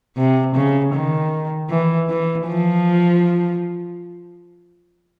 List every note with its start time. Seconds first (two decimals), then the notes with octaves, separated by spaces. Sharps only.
0.17 C3
0.55 C#3
0.94 D#3
1.70 E3
2.09 E3
2.47 F3